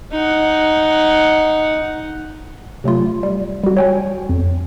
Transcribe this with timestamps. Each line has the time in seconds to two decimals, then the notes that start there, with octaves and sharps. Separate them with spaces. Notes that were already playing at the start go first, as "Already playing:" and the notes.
0.12 D#4 F#5
2.84 C3 F#3 A3 F4
3.23 G3
3.64 G3 F#4
3.77 C#5 G5 G#5
4.29 F2